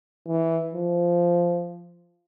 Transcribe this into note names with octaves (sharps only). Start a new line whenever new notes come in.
E3
F3